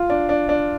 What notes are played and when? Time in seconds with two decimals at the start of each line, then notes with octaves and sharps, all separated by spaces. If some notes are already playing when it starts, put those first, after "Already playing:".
Already playing: F4
0.10 D4
0.29 D4
0.49 D4